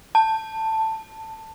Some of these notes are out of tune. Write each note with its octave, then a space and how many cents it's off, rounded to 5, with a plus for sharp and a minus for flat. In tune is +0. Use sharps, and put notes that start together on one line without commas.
A5 +10